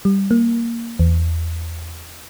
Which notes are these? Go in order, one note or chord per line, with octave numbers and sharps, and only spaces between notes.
G3
A#3
E2